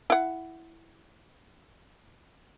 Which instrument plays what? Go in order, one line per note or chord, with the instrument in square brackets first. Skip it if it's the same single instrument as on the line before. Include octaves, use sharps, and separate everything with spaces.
[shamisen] E4 F#5